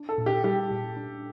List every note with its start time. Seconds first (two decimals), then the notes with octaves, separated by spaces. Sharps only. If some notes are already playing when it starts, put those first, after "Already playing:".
Already playing: D4
0.09 A4
0.18 A#2
0.26 G4
0.44 G3 G4
0.71 A#2
0.97 D4